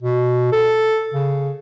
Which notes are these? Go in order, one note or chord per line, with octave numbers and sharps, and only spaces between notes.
B2
A4
C#3